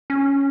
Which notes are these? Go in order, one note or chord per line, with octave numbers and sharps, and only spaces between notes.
C#4